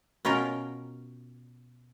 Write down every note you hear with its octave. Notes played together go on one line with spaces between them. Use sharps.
B2 C#4 F4 A#4 G5